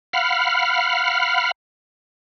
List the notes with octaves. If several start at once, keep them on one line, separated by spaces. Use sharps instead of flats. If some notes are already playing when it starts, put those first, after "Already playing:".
F5 F#5 B5 F6